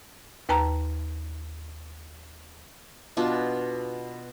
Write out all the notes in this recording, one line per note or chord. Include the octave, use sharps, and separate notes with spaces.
D#2 B4 G5 A5 A#5
B2 B3 D4 F4